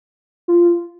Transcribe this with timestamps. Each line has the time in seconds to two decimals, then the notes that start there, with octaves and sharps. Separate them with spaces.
0.48 F4